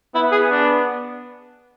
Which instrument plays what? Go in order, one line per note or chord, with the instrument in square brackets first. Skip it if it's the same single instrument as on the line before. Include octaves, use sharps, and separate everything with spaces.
[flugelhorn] B3 [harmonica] E4
[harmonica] G#4
D4